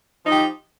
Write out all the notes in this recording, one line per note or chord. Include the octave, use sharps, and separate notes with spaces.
F3 D#4 G4